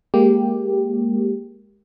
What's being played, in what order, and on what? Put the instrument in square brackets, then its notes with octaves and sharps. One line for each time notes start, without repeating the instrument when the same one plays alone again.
[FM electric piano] G#3 A#3 G4